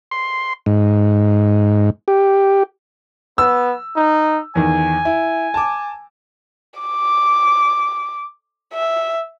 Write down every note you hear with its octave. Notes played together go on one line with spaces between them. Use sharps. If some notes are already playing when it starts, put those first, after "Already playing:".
C6
G#2
G4
B3 E6
D#4
E2 D#3 G#5
E4
A5 D6
D6
E5